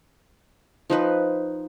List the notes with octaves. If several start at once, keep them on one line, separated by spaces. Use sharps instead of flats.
F3 D#4 B4